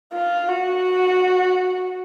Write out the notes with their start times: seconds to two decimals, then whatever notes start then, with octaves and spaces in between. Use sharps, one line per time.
0.13 F4
0.48 F#4